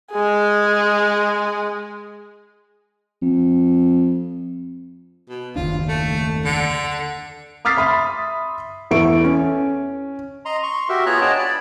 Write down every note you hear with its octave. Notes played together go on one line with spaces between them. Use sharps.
G#3 G#4
F2
B2
F#1 D#2 D4 F4
A3
D3
D6 D#6 F6 A6 B6 C7
E5 B5 C6 D#6
E2 B3 A4 E5 C#6 D7
C#4
D#5 A#5 C6
C6 C#6
F#4 G4 A#4 E5
B3 F4 G#4 C#5 A#5 F#6
D4 G#4 C#5 D#5 G5 A5
D5 B5